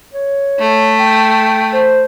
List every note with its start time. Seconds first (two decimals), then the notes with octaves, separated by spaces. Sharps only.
0.13 C#5
0.60 A3
0.99 G5
1.73 C5